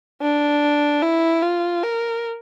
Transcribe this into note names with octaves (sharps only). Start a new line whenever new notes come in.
D4
E4
F4
A#4